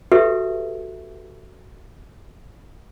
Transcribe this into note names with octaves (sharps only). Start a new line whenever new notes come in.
F#4 G4 A4 B4 E5